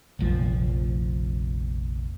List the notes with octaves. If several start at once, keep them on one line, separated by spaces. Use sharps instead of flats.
F1 A#1 F3